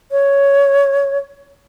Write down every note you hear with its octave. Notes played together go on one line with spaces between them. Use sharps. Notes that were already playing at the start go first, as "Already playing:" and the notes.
C#5